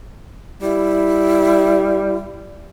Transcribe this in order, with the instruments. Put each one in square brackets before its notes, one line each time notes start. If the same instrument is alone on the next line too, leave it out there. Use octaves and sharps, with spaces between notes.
[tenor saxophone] G3 [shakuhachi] E4